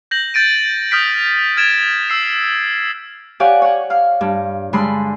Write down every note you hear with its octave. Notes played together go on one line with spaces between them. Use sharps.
G6 A#6 F#7
G6 A6 D7 D#7
D#6 F6 G6 B6 D7
F6 G#6 A6 D7 E7
E6 C7
G4 C#5 D5 F5 F#5 G#5
C#5 F#5
F5 F6
G2
G2 D3 G3 G#3 B5 C6